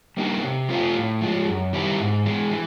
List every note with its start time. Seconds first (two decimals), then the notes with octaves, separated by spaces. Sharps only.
0.17 G3 A#3 D#4 F#4
0.42 C3
0.69 F3 A3 C4 F4
0.95 A2
1.21 F3 G#3
1.48 F#2
1.73 D#3 G3 C4 E4
1.99 G#2
2.26 E3 G#3
2.51 E3